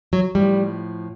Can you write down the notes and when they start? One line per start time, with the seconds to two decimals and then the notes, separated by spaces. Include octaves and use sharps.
0.13 F#3
0.35 A2 F3 G3